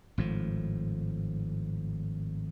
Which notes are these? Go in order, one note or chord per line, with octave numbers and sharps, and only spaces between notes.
G#1 A2 F3